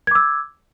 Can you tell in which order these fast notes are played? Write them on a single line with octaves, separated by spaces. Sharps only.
G#6 D6 E6